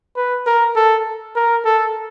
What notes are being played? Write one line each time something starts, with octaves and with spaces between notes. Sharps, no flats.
B4
A#4
A4
A#4
A4